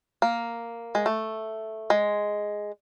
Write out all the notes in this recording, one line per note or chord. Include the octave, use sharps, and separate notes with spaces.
A#3
G#3
A3
G#3